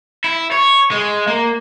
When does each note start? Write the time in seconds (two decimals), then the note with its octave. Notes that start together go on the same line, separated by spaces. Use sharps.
0.24 E4
0.51 C#5
0.91 G#3
1.27 A#3